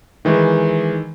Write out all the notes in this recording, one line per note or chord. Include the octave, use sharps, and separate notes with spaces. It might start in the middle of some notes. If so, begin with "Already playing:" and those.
D#3 E3 G#3